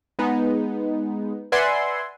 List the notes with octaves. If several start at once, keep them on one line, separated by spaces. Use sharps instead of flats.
G#3 B3 D#4
B4 D5 E5 F#5 G#5 C6